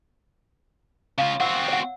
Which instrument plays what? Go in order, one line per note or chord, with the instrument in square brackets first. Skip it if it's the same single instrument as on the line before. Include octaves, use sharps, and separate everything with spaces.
[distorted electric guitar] C#3 F4 [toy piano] F5
[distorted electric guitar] C4 F#4 [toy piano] F#5 E6
[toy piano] C#5 F#5